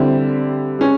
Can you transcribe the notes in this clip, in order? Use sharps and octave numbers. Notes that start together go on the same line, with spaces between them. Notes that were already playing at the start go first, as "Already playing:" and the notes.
Already playing: D3 G3 C4 E4
G#3 C#4